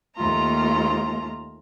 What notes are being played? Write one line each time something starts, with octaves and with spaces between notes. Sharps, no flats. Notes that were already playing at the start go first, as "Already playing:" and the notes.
D#2 A3 A#3 F4 A#5 C6